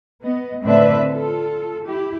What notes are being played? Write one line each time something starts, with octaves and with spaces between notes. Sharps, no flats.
B3 D#5
A2 D3 C4 D4 B4 E5
F4 A4
E4 G4